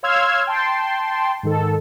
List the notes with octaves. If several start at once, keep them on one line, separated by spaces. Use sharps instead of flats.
C#5 F5 C6 E6 F6 G#6
G5 A5 C6
G#2 D#3 A4